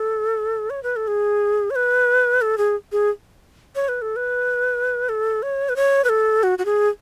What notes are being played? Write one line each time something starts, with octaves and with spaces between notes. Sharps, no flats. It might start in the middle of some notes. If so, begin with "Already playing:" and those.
Already playing: A4
C#5
B4
A4
G#4
C#5
B4
A4
G#4
G#4
C#5
B4
A4
B4
A4
C#5
B4
C#5
B4
A4
F#4
F#4
G#4